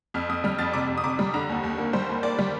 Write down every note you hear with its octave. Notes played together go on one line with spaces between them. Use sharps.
F2 F6
F2 D#6
G3 F6
F2 A6
C3 D6
F2
D#6
C3 D6
G3
D3 A#5
D#2
D#2
A#3
G3 C5
D#2
A#3 D5
G3